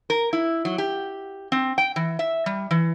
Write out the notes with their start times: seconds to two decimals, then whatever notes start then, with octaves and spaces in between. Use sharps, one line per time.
0.10 A#4
0.33 E4
0.65 F#3
0.78 G4
1.52 C4
1.78 G5
1.96 E3
2.19 E5
2.46 G3
2.71 E3